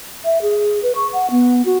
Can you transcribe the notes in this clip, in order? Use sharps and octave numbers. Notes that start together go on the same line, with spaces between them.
E5
G#4
B4
C#6
F#5
B3
F#4